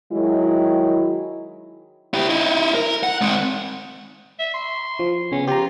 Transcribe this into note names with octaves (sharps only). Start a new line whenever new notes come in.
D#3 F#3 G#3 E4
E4 G4
D#4 E4
A#4
F#5
G#3 C4
E5
C6
F3
C#3 B3 C#4
F4 G4 A#5